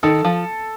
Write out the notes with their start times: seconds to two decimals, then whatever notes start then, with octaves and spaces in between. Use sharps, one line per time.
0.03 D#3 A4
0.25 F3